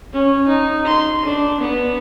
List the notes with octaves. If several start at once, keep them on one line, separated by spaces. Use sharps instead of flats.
C#4
D#4
C6
D4
B3